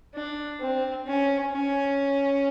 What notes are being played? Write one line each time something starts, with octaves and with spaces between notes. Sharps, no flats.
D4
C4
C#4
C#4